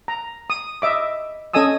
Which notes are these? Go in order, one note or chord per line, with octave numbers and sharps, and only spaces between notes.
A#5
D#6
D#5 E5 D6
C#4 A4 D#5 G#5 D#6 E6